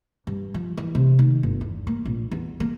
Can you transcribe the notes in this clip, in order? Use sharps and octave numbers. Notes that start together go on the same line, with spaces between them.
G2
F3
E3
C3
D#3
G1
E2
A#3
A#1
E2
A#3